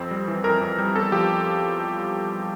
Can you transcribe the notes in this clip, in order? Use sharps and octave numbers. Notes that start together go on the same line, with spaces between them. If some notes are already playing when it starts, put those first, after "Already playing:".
Already playing: F2 C4
G3
E3
F2 A#4
F2
G3
E2 A4
F3 G4